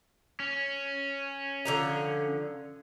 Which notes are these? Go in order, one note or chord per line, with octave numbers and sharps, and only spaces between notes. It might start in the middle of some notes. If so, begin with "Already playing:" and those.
C#4
D3 F3 A#5